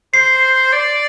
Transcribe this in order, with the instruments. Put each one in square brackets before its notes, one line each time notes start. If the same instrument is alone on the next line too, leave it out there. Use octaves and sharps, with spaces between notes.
[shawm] C5 [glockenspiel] C7
[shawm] D5